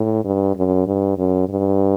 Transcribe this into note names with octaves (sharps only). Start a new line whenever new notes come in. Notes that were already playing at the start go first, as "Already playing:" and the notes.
Already playing: A2
G2
F#2
G2
F#2
G2